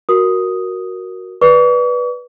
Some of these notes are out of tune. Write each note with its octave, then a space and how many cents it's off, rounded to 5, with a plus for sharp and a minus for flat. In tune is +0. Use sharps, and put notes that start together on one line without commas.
F#4 +0 A#4 +0 D#6 +0
B4 -10 D5 +0 C#6 +45